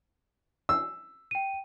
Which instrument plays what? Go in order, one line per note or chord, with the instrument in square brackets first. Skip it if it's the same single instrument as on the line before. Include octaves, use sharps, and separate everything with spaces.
[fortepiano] E6
[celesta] G5 D#7